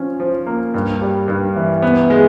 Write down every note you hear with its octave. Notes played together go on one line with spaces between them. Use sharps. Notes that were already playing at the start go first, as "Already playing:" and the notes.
Already playing: F3 C#4
F3
A#3
G2
G3
G2
E3
B3
G#3